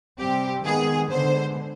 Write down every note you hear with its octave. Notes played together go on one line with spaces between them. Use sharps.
C3 G3 C4 G4
D#3 G#3 B3 G#4
D3 G#3 B3 C5